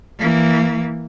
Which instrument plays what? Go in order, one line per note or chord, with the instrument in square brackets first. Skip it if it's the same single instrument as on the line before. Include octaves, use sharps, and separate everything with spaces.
[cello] E3 A#3